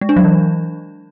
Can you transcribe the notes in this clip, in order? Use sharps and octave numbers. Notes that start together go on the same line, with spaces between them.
G#3
D4
F#3
E3